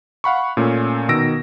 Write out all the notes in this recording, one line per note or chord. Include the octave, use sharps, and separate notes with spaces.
F5 F#5 B5 C#6
A#2 A3 C#4 A4
B2 D#3 E6 A#6 D7